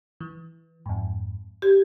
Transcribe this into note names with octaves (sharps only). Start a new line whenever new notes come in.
E3
F2 G#2
G4 G#6